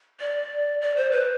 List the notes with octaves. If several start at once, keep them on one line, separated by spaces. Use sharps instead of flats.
D5
D5
C5
B4